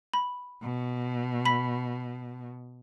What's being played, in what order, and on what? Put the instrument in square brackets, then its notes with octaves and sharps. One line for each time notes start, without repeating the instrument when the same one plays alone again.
[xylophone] B5
[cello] B2
[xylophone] B5 B6